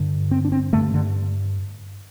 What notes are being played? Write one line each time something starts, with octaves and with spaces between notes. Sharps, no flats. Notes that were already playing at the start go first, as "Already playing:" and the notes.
Already playing: G2 D3
C4
D4
C4
G2 D3 A3
D3